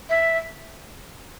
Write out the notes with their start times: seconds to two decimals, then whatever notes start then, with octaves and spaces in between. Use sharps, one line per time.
0.10 E5